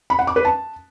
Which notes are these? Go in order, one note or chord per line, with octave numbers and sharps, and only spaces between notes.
B5
F#5
D6
B4
A5